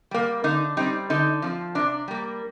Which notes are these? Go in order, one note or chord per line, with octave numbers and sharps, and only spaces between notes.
G3 A#3
D3 D#4
G3 C4 D#4
D3 D#4
F3 C4
C3 D4
G3 A#3